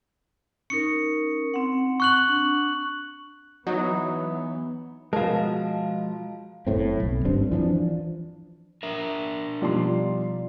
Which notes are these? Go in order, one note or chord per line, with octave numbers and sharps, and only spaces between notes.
C#4 D#4 A#4 C#7
C4 F#5
C#6 F#6 F#7
D4
E3 F#3 B3 D#4
B2 F3 G#3 A#4 F5 A5
F#1 A2 C4
B1
G#1 G2 C4 D4
E3 F3 C4 D4
D4 A#4 E5
B2 F3 G3 D#4 F4 D5 C6